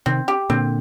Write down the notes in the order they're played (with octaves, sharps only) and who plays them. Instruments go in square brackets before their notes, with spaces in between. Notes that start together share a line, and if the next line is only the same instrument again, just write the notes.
[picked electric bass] C3 D#3 [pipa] C4
[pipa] G4
[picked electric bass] A#2 D3 [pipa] C4